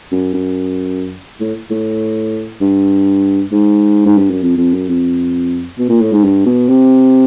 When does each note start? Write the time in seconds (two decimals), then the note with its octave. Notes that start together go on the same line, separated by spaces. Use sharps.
0.12 F#2
0.34 F#2
1.40 A2
1.70 A2
2.61 G2
3.52 G#2
4.06 G#2
4.18 G2
4.30 F#2
4.42 F2
4.57 F2
4.73 F#2
4.88 F2
5.78 B2
5.89 A#2
6.01 A2
6.13 G#2
6.24 G2
6.46 B2
6.69 C3